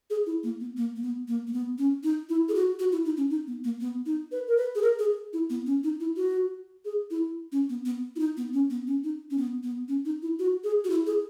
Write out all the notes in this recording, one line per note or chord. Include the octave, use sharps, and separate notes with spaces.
G#4
E4
A#3
B3
A#3
A#3
B3
A#3
A#3
B3
C#4
D#4
E4
G#4
F#4
F#4
E4
D#4
C#4
D#4
B3
A#3
B3
D#4
B4
A#4
B4
G#4
A#4
G#4
E4
B3
C#4
D#4
E4
F#4
G#4
E4
C#4
B3
B3
E4
D#4
B3
C#4
B3
C#4
D#4
C#4
B3
B3
C#4
D#4
E4
F#4
G#4
F#4
E4
G#4